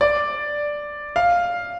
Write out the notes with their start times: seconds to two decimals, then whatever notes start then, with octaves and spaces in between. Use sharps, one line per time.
0.01 D5
1.16 F5